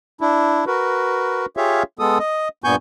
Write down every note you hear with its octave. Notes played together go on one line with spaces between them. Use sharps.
D4 E4
F#4 A#4 B4
F4 G4 G#4 C#5 E5 F5
G#3 B3 A4 D#6
D#5
G2 A#2 B3 G#5 C#6 G6